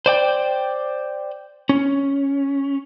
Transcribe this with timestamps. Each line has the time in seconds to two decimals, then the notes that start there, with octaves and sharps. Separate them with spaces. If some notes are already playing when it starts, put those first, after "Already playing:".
0.06 C5 D5 G5
1.69 C#4